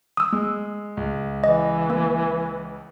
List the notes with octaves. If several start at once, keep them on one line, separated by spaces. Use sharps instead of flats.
D#6 E6
G#3
C#2
E3 D#5
A#3